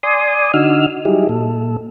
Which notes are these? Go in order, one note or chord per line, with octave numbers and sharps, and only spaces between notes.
D5 G#5 C6 D#6
D3 D#4 F#4 E6 F6
F#3 G3 D#4 E4 G4 G#4
A#2 A4